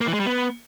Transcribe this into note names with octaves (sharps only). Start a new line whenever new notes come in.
A#3
E3
G#3
G3
B3